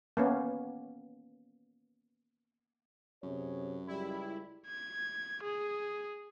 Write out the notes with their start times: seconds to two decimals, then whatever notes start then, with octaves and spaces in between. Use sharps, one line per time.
0.17 A#3 B3 C#4
3.23 F#2 C3 G#4 C#5
3.87 C#2 G3 E4
4.67 G#6
5.43 G#4